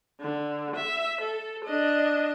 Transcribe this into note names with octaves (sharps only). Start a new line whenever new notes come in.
D3
E5
A4
D4 D#5